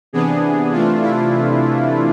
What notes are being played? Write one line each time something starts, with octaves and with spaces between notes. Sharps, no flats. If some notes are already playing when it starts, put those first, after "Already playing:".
C3 E3 B3 D4 G#4
C3 E3 A3 D4 F4
E4